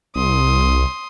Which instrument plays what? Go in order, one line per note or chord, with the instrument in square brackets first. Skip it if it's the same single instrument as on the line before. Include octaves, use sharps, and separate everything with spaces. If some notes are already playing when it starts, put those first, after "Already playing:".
[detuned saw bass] C2 [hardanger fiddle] C6 D#6